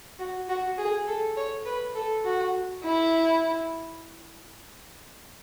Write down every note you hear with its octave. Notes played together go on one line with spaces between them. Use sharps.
F#4
F#4
G#4
A4
C#5
B4
A4
F#4
E4